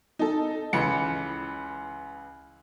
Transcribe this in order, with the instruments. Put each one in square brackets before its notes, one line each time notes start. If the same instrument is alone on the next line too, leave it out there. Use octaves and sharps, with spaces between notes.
[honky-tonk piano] D#4 A4
[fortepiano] C#2 E3 [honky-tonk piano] C#7